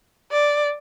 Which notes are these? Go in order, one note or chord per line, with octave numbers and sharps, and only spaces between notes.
D5